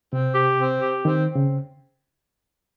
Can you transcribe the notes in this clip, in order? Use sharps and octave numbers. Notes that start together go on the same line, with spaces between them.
C3 C4
G4
C4
G4
D#3 C4
C4
C#3